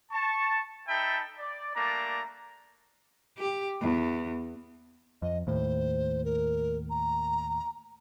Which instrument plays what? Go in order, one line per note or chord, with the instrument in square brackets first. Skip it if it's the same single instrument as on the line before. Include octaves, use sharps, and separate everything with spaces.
[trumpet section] A5 C#6
D#4 A4 E5 G5 A5 B5
D5
G3 A3 A#3 D4 D5 A#5
[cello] G4
E2
[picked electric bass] F2 [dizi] D#5
[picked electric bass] D#2 A2 [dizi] C5
[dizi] A#4
A#5